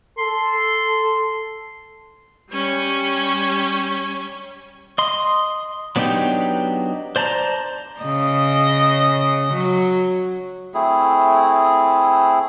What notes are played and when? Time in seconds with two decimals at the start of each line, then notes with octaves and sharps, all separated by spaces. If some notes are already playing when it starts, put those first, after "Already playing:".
0.18 A4 C6
2.51 G3 C#4
4.98 D#5 C6
5.96 F#3 B3 D4 D#4 G4
7.16 C5 D5 A5 A#5
8.01 C#3 D#5
9.53 F#3
10.74 A3 C4 E4 G#4